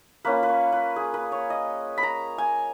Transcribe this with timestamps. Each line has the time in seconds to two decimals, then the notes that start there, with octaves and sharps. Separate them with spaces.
0.25 A#3 C#4 F4 B4
0.43 B4
0.49 C#5
0.72 B4
0.96 G#4
1.14 B4
1.32 C#5
1.50 D#5
1.98 B5
2.03 A#5
2.38 G#5